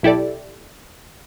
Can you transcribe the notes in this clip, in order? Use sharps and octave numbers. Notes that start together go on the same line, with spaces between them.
B1 E4 G4 A4 D5